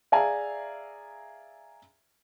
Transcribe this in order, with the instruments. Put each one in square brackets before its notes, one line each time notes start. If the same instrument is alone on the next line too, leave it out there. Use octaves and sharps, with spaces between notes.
[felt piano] G#4 D5 E5 F5 G#5 A#5